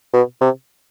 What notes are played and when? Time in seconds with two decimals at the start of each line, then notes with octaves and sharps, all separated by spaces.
0.14 B2
0.41 C3